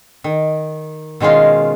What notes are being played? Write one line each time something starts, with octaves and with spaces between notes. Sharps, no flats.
D#3
B2 D#3 G#3 C#4 F4